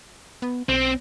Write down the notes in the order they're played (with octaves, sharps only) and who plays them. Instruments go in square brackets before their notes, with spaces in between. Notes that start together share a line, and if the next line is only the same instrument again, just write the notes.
[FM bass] B3
[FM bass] B1 [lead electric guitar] C4